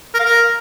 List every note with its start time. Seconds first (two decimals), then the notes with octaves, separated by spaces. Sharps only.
0.14 A#4
0.19 F5
0.25 A#4